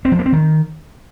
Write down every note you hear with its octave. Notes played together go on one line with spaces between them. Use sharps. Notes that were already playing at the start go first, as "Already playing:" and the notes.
C4
F3
A#3
C4
D#3